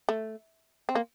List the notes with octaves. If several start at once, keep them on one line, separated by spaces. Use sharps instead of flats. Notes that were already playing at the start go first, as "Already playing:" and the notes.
A3
C4
A#3